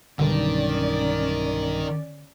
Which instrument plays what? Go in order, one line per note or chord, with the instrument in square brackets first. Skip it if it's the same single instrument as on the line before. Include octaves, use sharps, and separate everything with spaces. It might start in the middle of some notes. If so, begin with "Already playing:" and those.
[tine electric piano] B1 G2 [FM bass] D3 [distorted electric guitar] D#3 [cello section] C#4 D5